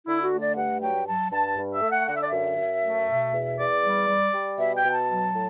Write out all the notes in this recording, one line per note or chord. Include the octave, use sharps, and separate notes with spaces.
D3 E4
F#4
A3
D5
G2 F#5
F#3 G5
F#3 A5
G2 A5
G2
E5
A3
F#5
D3 F#5
E5
D5
F#2 E5
F#2
A3
B2
E2
E2 D5
G3
G3
G3
B2 E5
G5
B2
A5
F#3
A2